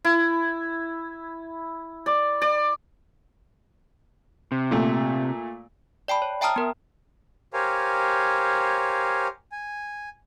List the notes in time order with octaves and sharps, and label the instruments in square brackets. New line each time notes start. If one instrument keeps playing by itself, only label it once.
[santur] E4
D5
D5
[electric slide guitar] C3
[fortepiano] A#2 A3
[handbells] D5 G5 A5 B5
C#5
E5 G5 A5 A#5 D#6 F6
B3 A#4
[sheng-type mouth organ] G4 A#4 C5 C#5 F5 G#5
G#5